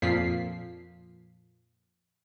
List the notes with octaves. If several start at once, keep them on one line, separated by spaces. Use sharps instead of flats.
F2 A#2 F3 B6 C7